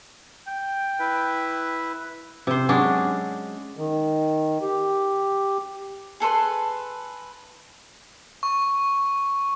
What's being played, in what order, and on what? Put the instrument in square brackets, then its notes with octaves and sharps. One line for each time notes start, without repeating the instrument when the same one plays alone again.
[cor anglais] G5
[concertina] E4 B4
[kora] C3 C5
F#3 G#3 C#4 D4
[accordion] D#3
G4
[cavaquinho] G#4 A4 B4 C6
[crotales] C#6